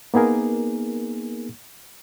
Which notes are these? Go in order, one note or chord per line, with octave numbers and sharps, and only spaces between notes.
A#3 B3 D#4 G#4 A#4